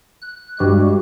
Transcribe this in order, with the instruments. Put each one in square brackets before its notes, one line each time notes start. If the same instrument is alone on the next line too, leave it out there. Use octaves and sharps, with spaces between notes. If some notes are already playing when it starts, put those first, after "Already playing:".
[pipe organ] F#6
[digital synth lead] G2 [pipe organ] G#3 F#4 G4